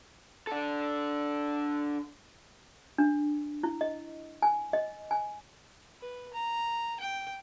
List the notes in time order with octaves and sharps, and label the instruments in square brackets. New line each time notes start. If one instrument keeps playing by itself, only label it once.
[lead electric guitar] D4 A4
[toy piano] D4
E4
D#5
G#5
D#5
G#5
[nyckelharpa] B4
A#5
G5